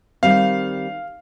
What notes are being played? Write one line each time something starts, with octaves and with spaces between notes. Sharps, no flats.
D#3 G3 C4 F5